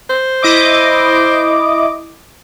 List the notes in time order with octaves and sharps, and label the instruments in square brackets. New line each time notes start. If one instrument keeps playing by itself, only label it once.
[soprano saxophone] C5
[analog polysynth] E4 D#5 D6